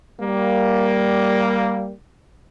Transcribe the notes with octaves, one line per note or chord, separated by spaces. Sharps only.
G3 A#3